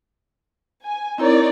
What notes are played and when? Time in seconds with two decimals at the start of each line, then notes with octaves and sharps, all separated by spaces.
0.84 G#5
1.18 C4 D#4 E4 A#4 C#5 D5